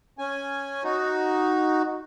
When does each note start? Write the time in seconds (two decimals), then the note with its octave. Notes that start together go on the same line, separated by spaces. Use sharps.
0.18 C#4 G#5
0.84 D#4 F#4